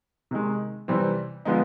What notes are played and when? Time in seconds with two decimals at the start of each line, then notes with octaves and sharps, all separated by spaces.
0.31 C3 D#3 G#3
0.88 C3 E3 G3 C4
1.45 D3 F3 G#3 B3 D#4